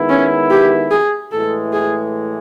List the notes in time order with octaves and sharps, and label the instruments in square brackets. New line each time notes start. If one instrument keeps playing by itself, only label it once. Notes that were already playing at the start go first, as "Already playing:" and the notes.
Already playing: [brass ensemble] D#3 G#3 B3 E4
[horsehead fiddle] C#4
G4
G#4
[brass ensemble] A2 E3 G#3 [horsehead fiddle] A4
[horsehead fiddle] G#4